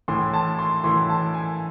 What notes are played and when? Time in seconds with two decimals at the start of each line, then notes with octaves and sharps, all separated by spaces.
0.08 A2 E3 C6
0.33 A5
0.59 C6
0.84 A2 E3 C6
1.09 A5
1.34 G#5